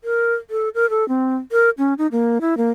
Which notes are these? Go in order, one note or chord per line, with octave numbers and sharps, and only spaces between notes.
A#4
A4
A#4
A4
C4
A#4
C#4
D#4
A#3
E4
A#3